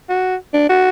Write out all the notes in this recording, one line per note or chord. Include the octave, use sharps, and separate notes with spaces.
F#4
D4
F#4